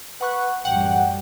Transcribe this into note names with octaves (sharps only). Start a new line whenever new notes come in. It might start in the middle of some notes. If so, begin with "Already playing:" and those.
B4 F#5 C#6 F#6
A1 F#2 G3 F#5 G5